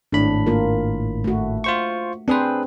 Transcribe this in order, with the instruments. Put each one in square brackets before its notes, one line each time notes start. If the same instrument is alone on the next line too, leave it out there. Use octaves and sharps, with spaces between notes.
[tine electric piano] G#1 A2 B5 [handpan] D4
[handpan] A#3 F4 A#4
A3 F#4
[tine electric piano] F4 C5 C#6
[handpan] C4 C5 [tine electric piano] D4 G#4 B4